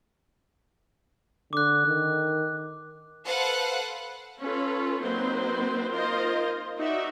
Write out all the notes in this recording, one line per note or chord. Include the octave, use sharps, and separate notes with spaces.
D3 D6 F#6
D#3
A4 B4 C5 F5 F#5
C#4 F4 A4 B4
F#3 A#3 C4 D#4 B4 C5
D#4 F4 A#4 C5 D#5
D#4 F#4 D5 E5